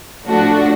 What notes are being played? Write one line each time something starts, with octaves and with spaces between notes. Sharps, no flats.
A2 F3 A3 D4 F#4